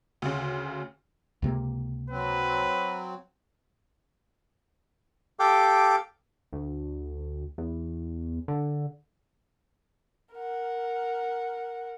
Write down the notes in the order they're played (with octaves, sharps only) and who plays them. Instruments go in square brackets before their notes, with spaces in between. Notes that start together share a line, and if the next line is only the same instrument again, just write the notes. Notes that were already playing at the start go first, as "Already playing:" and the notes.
[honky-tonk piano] D2 C#3
[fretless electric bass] C#2 C3 A#3
[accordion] F#3 C4 [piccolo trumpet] B4
[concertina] G4 A4 F5 G5 D6
[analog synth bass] D2
E2
D3
[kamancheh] A#4 F#5